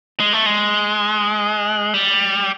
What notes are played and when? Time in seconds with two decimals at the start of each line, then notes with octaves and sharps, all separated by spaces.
0.20 G#3
0.33 A3
0.46 G#3
1.94 G3